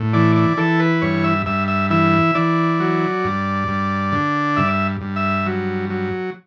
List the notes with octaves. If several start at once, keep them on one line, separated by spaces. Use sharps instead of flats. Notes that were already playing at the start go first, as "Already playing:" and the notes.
Already playing: A2
E3 D5
D5
E3 A4
B4
G2 C#5
E5
G2 E5
E5
E3 E5
E3 D5
F#3
G2
G2
D3
G2 E5
G2
E5
F#3
F#3